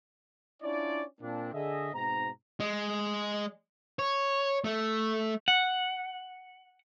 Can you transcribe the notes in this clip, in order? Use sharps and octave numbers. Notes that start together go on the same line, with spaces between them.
C#4 D4 E4 F4 C#5 D5
A#2 A#3 C4 D4
D3 G#4 D#5 E5
G#2 B2 C4 D#4 A#5
G#3
C#5
A3
F#5